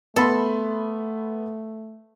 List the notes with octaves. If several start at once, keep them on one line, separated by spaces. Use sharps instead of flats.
A3 B3 A4 B5 C6